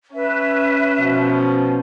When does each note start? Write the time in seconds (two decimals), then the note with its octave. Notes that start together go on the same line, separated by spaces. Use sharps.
0.14 C#4 B4 E5
0.99 B2 F3